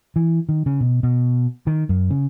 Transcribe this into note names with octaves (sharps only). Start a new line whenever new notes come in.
E3
D#3
C#3
B2
B2
D#3
F#2
C#3